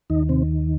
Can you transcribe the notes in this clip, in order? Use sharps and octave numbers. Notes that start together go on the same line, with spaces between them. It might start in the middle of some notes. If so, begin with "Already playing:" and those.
D#2 D#3 D#4
C3 C4